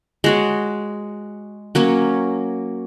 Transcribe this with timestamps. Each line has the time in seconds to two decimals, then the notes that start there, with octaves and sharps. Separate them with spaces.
0.24 G#3 F#4 C#5
1.75 F#3 A#3 C#4